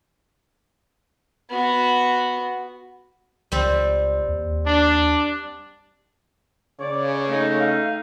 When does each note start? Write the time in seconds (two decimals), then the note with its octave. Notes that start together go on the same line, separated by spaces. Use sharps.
1.50 B3 F#4
3.52 C#2 G3 C4
4.28 D#2
4.67 D4
6.80 C#3 C#5 D5
7.25 A3 D#4
7.59 F5